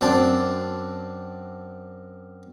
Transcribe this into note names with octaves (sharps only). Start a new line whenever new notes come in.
F#2 C4 D4 A5